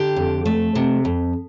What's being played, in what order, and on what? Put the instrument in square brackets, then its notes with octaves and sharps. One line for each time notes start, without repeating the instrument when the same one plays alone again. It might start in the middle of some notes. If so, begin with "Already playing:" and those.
Already playing: [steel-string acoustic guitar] D3 G4
F2
A3
C3
F2